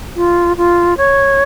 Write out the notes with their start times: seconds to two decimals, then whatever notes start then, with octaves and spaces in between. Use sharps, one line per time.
0.16 F4
0.58 F4
0.97 C#5